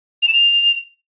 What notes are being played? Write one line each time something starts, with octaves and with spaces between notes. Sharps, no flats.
F7
E7
F7